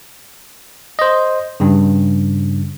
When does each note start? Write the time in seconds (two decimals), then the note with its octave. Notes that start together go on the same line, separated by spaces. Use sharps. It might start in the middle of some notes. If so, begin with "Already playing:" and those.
0.99 C5 D#5
1.60 G2 C#3